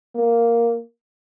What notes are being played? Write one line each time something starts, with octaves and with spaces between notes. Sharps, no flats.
A#3